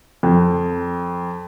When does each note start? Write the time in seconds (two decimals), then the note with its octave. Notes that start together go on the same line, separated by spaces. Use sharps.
0.23 F2